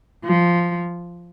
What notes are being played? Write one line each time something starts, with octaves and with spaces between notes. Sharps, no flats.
F3